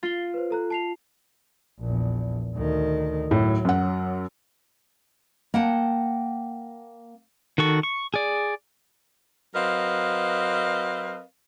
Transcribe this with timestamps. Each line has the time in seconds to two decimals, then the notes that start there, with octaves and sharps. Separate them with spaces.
0.03 F4 A6 C7 G7
0.34 B4 C5
0.50 A4 A#5 F#6
0.70 A5 C7 F7
1.80 A#1 E2
2.54 D2 D#3
3.31 A2 F#3
3.65 F#2 F#5
5.54 A#3 F#5 G5 A5
7.58 D#3 F#4 A4 C#6
7.83 C#6
8.14 G#4 D5
9.55 F#3 C4 A#4 B4 D#5 F5